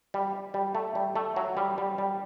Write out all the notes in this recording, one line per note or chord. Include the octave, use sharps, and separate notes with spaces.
G3
G3
A3
G3
A3
F#3
G3
G3
G3